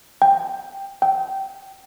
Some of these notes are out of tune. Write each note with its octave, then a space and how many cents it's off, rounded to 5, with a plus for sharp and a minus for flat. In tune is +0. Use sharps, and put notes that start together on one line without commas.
G5 +5
G5 -15